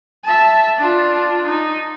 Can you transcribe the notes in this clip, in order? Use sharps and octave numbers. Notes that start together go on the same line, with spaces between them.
E5 A5
D4 F4
D#4